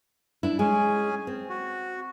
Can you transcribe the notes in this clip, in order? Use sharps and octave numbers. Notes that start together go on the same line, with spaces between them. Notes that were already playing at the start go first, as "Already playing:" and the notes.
D4 E4
G#3 C#4 G#4 G#5
C4
F#4